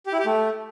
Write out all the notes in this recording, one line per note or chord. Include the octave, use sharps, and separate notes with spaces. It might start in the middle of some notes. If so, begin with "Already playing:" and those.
G4
E4
G4
A3